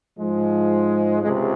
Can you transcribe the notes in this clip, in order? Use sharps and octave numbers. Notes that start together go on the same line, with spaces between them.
G#2 F3 G#3
C#2 C3 G#3